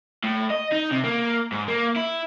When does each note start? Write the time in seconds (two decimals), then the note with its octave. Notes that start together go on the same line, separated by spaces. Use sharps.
0.24 A2
0.50 D#5
0.72 D#4
0.91 C3
1.04 A#3
1.52 G#2
1.68 A#3
1.96 E4